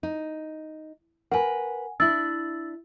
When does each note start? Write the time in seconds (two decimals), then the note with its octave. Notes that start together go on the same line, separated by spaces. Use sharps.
0.03 D#4
1.32 A#4 B4 F#5 G#5
2.00 D4 E4 E6 A6